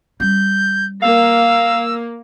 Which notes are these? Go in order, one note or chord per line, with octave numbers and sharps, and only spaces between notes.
G3 C#4 G6
A#3 F5 E6